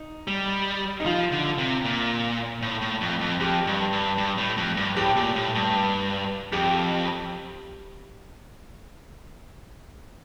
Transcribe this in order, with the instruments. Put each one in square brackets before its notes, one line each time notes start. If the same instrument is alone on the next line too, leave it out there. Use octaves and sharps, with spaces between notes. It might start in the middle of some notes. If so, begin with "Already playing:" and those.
Already playing: [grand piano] D#4
[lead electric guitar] G3
[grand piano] D#4
[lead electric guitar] F3 [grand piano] F4
[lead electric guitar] D3
C3
A#2
A2
A2
F2
F2
[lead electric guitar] F2 [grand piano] G4
[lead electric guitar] G2
G2
G2
A2
F2
G2
[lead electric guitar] A2 [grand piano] G4
[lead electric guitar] A#2
A2
G2
[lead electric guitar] F2 [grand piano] G4